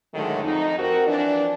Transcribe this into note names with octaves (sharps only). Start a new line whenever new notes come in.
A2 D3 D#3 F#3 G#3 A3
F2 D#4
C4 F#4 A#4
E3 F3 C4 D4